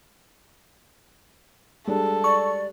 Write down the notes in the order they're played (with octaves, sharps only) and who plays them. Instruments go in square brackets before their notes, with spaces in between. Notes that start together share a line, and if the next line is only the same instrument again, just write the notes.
[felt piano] G3 G#3 D4 [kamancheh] A4
[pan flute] D5 [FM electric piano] C#6